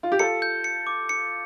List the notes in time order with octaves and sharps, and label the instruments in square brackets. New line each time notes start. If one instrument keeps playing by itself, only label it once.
[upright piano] F4
G4
[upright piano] F4 A4 [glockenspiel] C#7
[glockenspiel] G6
C#7
D6
C#7